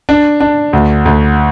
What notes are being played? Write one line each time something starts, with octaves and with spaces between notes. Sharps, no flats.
D4
D4
D2
D2